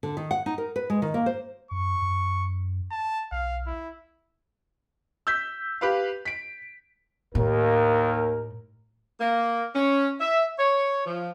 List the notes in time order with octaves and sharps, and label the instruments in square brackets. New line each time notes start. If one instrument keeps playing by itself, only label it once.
[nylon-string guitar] D3
D#3
F#5
D#4
A#4
B4
G#3
D#3
A#3
C5
[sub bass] F#2 [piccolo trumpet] C#6
[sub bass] F#2
[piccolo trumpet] A5
[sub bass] B1 [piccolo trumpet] F5
[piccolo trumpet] E4
[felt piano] E6 G6 B6
G4 B4 F5
B6 D7
[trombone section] D#2 A#4 [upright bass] A2
[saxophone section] A#3
C#4
E5
C#5
F3